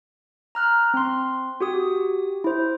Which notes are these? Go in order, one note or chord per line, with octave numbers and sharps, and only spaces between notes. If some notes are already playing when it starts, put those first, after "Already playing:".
A#5 F6 F#6
C4 C6
F#4 G4 D#6
E4 C5